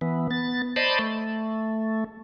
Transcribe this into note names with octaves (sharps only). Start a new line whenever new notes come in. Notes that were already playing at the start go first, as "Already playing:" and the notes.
E3 B3
B3 A6
C5 D5 D#5 A5 B5
A3